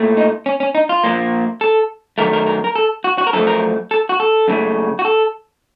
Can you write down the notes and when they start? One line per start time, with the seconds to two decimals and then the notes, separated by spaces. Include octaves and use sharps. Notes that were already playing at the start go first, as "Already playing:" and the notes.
Already playing: A#2 A3
0.17 D#4
0.46 C#4
0.60 C#4
0.75 D#4
0.89 F4
1.04 A#2 F3 A#3
1.61 A4
2.18 F#2 D#3 A3 A#4
2.33 A#4
2.46 A#4
2.64 A#4
2.76 A4
3.04 F#4
3.18 F#4
3.27 A#4
3.33 F#2 F3 A3 A4
3.47 A#4
3.91 A4
4.09 F#4
4.20 A4
4.48 F#2 C#3 A3
4.99 F#4
5.05 A4